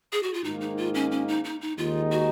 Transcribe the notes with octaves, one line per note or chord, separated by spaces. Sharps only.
G#4
F#4
F4
G#2 D#3 A#3 D#4
D#4
F4
C#4
C#4
D#4
D#4
D#4
D#2 D#3 G#3 D#4 F4
F#4